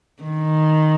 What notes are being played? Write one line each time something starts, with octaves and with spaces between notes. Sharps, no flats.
D#3